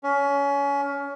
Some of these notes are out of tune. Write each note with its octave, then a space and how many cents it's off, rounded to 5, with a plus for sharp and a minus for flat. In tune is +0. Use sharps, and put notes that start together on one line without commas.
C#4 +25